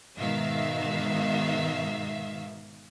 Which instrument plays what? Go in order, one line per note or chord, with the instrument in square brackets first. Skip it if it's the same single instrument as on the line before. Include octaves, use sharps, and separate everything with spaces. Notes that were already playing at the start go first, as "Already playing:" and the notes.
[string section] G#2 B2 D#3 E5 F5